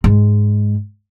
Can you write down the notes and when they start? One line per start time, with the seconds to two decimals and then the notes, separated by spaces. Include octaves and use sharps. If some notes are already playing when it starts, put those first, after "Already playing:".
0.04 G#2 G#3